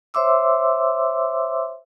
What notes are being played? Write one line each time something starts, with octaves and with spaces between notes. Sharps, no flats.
C5 C#5 E5 C6 D6 E6